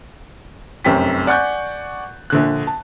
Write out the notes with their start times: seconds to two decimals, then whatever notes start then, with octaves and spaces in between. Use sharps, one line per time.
0.85 F1 F#2 C4 G4 B6
1.27 D5 F#5 G#5 C#6 F#6 G6
2.30 A#1 D3 F#6
2.67 A5